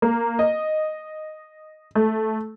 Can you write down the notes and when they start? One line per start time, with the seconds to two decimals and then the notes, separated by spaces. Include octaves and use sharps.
0.02 A#3
0.39 D#5
1.95 A3